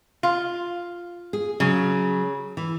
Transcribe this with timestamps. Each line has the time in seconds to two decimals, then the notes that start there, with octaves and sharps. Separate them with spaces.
0.23 F4
1.33 G#4
1.60 C#3 F#3
2.57 E3